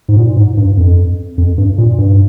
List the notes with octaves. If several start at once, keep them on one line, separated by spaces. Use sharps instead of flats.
G#2
A#2
G#2
G2
F2
F2
G2
A#2
G2